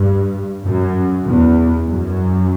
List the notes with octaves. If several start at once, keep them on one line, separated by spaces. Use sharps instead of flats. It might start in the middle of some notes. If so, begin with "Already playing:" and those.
Already playing: G2
F#2
E2
F#2